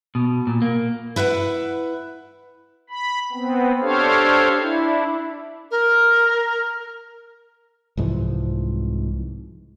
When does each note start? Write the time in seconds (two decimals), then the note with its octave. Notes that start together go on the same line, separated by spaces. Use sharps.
0.15 B2
0.47 A#2
0.62 A#3
1.16 E4 B4 E5 F#5
2.90 B5
3.32 B3 C4
3.81 D4 G4 A4 C5 C#5 F5
4.61 D4 E4
5.71 A#4
7.97 C2 G#2 E3 F3